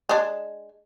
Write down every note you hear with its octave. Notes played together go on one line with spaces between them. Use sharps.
G#3 D4